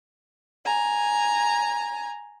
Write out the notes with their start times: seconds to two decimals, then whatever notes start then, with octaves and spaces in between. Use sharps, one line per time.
0.64 G#5 A#5